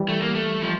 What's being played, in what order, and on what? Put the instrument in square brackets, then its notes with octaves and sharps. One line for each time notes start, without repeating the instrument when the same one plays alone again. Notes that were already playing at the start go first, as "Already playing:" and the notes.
Already playing: [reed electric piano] E3 G3
[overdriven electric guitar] A3
A#3
A3
F3